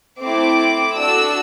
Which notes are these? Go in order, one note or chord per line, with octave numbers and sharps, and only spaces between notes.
A3 C4 E4 D6
D4 F#4 A4 E6